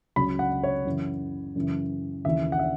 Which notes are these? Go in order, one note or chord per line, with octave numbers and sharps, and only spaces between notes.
C#2 C#3 F#3 B5
F#5
C#5
F#2 C#3 E3
F#2 C#3 E3
D#2 C#3 E3 E5
F#5
E5